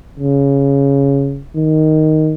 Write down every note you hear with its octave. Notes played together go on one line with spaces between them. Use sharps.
C#3
D#3